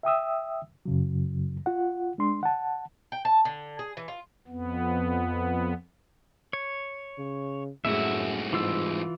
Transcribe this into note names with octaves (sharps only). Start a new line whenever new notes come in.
E5 G5 D#6 E6
F#2 C#3 F#3
F4 F#5
G#3 D4 C6
F#5 A5
G5
A5
D3
G#4
E3
F4
F2 B3
C#5
C#3
C2 F#2 A2 G#3 A3 F#4 E5
G#2 E3 F4 E6